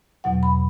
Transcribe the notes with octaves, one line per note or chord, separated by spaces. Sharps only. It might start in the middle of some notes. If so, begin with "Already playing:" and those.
E2 B2 F#3 F#5
B5